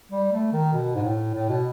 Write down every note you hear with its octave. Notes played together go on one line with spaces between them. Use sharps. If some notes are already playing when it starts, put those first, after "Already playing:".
G3
A3
D#3
B2
G#2
A2
A2
B2